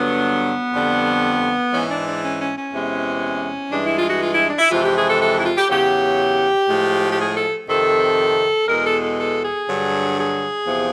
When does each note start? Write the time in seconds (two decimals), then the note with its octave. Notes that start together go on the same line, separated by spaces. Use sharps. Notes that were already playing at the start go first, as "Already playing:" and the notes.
Already playing: G2 D3 F#3 B3
0.73 F2 D3 G3
1.72 G#2 E3 G#3 C#4
1.89 D4
2.06 D4
2.22 C#4
2.38 C#4
2.56 C#4
2.72 E2 C3 E3 G#3
3.71 G2 E3 G#3 D4
3.84 E4
3.96 F4
4.09 F#4
4.21 F4
4.33 E4
4.46 D4
4.59 E4
4.70 F2 C3 E3 G#3 F4
4.84 G4
4.95 G#4
5.07 A4
5.21 A4
5.37 E4
5.45 F4
5.57 G4
5.69 E2 C#3 F#3 G4
6.69 A2 F3 G#3
7.10 G4
7.19 G#4
7.35 A4
7.68 F2 C3 D#3 A4
8.68 E2 B2 G#3 A#4
8.85 A4
9.01 A4
9.17 A4
9.43 G#4
9.67 G2 D3 F#3
10.18 G#4
10.66 E2 C3 F3